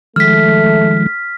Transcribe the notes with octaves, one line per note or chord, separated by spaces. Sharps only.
D#3 F3 G#3 A3 F6 B6